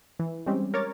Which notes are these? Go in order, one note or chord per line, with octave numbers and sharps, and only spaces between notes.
E3
G3 G#3 C4 C#4 G4
A#4 C#5 D6 A6